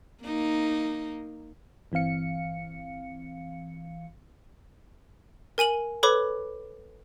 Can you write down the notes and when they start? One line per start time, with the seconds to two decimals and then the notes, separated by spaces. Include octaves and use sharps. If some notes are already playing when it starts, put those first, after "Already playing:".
0.23 A#3 D#4
1.92 G1 E3 C4 F5 C#7
5.58 A#4 G#5 D#7 F#7
6.03 A4 B4 C#5 B5 D6